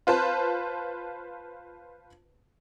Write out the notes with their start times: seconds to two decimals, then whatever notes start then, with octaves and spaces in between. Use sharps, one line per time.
0.07 F4 B4 C5 A5